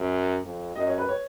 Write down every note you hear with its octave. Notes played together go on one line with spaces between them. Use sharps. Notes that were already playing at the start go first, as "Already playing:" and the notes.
Already playing: F#2
F2
F#2 D#5
C#5
B4
C#5